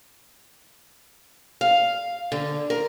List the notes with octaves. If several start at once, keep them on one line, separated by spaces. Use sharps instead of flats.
F5
D3
A#4